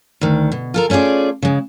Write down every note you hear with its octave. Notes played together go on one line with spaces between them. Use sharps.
D2 D#3
B2
F4 A4 A#4
A3 C#4 F4 G#4 D5
C#3 G#3